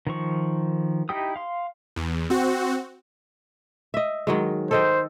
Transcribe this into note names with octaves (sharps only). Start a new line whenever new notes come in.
D#3 F3 C#6
D#4 E4 G4 G5 D#6
F5 C6
E2
C4 F#4
D#5 E5
D#3 F#3 G#3
A4 C5 D#5 G5